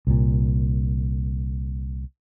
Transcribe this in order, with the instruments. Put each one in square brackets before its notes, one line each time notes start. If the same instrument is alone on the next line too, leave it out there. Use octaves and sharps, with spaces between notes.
[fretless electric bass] C2 A#2